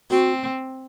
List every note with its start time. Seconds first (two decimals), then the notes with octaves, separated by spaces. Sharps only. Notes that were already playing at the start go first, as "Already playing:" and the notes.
0.11 C4 F#4